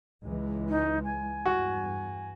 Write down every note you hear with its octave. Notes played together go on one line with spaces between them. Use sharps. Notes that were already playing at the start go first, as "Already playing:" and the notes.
C#2 E3 G#3
D#4
G#5
E2 G2 F#4